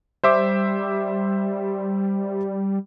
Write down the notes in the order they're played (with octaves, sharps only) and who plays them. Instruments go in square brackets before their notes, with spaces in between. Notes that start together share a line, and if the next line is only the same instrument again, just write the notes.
[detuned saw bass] G3 [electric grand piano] C5 E5 D6